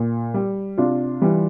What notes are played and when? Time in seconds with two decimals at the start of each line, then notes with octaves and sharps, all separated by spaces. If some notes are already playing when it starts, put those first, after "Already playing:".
Already playing: A#2
0.34 G3
0.78 C3 D4 F4
1.22 E3 G3